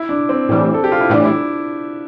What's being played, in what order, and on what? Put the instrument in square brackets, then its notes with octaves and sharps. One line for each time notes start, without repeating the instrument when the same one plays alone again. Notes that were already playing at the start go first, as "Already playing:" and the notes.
Already playing: [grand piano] E4
D4
C4
[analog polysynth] A2 E3 G3
[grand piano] A4
G4
F4
E4
[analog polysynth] A2 E3 G3 [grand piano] D4
[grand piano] E4